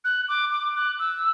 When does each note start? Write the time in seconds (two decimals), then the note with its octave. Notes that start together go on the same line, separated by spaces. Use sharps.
0.04 F#6
0.28 D6
0.51 D6
0.75 F#6
0.99 E6